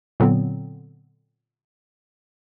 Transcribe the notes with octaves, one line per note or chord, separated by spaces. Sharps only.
A#2 D3 F#3 B3 C4